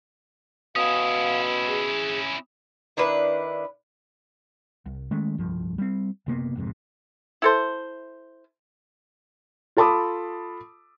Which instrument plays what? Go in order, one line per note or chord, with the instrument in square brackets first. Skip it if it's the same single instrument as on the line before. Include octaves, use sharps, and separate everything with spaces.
[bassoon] B2 [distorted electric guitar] C#4 E4 [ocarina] F5 [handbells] D#6
[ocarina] G#4
[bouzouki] D#3 D4 E4 B4
[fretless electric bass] C2
D#3 G#3 A3 C#4
D1 C2 G2 F3
G3 C4
F#1 C3 A#3 B3
A1 F2 G#2 C3
[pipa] E4 A4 C5
[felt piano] F4 A4 A5 B5 D6 D#6